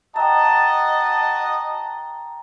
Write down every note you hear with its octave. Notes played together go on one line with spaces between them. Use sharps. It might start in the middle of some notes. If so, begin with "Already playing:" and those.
F#4 D#5 G5 A5 A#5